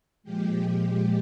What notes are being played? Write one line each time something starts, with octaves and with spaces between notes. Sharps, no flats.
A#2 F3 G#3 G4